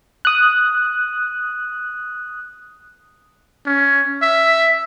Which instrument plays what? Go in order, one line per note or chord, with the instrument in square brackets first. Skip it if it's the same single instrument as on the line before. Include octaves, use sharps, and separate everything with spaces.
[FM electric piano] D#6 F#6
[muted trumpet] C#4
E5